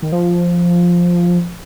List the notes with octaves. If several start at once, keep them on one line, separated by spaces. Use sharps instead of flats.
D#3
F3